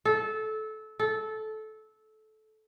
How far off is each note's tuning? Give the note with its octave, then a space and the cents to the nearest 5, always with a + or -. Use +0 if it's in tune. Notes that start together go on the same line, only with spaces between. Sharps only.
A4 -20
A4 -20